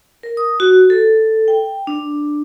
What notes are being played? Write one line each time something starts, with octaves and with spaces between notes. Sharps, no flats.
A#4
D#6
F#4
A4
G5
D4